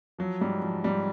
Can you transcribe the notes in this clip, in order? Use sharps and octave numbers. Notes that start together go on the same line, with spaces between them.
F3 F#3
G#2 G3
F3
G#2 G3